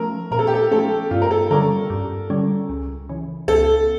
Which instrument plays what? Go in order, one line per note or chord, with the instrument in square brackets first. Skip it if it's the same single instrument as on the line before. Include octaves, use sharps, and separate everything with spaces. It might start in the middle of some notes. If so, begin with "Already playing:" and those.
Already playing: [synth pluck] F3 A3 C#4 [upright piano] A#4
[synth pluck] A#2 [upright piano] A#4
[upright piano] A4
G4
A4
[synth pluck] F3 A3 C#4 [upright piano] A4
[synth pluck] G2 [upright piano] F4
[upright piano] A#4
A4
[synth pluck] D3 G3 C#4 [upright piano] A#4
[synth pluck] G2
D3 G3 C#4
C#2
C#3 E3
[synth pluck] C#2 [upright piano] A4